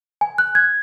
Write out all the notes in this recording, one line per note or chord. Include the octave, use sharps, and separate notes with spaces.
G#5
F#6
G#6